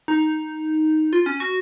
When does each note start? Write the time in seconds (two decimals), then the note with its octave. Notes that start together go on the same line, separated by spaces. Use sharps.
0.08 D#4
1.13 F4
1.26 C#4
1.40 F#4